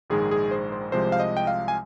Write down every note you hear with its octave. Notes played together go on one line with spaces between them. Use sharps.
A#1 G#2 D#3 G#3 G#4
G#4
C5
C5
C2 C3 F3 G#3 C5
F5
D#5
G5
F5
G#5